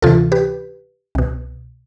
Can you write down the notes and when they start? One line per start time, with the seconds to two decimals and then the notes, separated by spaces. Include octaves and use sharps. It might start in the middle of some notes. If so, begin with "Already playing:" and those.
0.02 D2 C3 E3 F4 A4
0.32 G4 B4
1.15 C2 B2